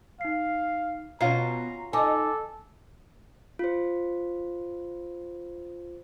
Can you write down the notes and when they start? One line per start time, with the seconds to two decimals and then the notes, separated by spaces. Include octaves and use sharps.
0.21 D#4 F5 C7
1.21 B2 C#4 F4 F#4 A#5 C7
1.93 D#4 A4 G#5 D6
3.59 F4 C5